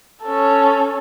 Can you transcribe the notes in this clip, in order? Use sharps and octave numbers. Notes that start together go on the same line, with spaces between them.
C#4 A4